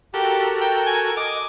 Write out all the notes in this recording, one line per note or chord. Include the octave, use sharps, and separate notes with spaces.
F#4 G4 A4 A#4
G5
G#5
D#5 D6